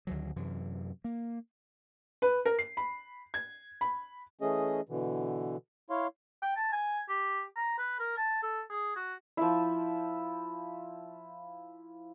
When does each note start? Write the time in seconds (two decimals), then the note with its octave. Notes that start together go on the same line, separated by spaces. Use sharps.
0.07 D2 D#3 F#3
0.36 F#2 C3 E3
1.04 A#3
2.22 B4
2.45 A#4
2.59 C7
2.77 B5
3.34 G#6
3.81 B5
4.41 E3 A3 C#4 G#4 D#5
4.89 B2 D3 E3
5.90 E4 C#5 F5 C6
6.43 G5
6.56 A5
6.73 G#5
7.09 G4
7.56 A#5
7.79 B4
8.00 A#4
8.17 A5
8.43 A4
8.70 G#4
8.96 F#4
9.37 F3 E4